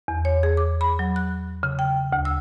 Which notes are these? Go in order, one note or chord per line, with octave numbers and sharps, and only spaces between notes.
E2
C#5
G#4
D6
B5
F#3
F#6
C#3
G5
D2
E6